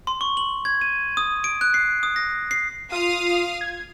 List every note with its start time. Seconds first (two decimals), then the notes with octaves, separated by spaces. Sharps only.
0.07 C6
0.21 C#6
0.37 F#7
0.65 G#6
0.81 D#7
1.17 D#6
1.44 D7
1.61 F#6
1.74 C7
2.03 D#6
2.16 A#6
2.51 C7
2.92 F4 F5 D#6
3.61 G#6